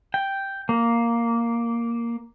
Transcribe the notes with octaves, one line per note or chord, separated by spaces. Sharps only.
G5
A#3